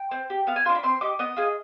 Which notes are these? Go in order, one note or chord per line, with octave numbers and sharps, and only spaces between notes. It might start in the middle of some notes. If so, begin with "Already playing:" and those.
Already playing: G5
C4
G4
B3 F5
G#5
D4 F4 C6
B5
C4 C6
D#4 G4 D6
B3 D#5
F4 G#4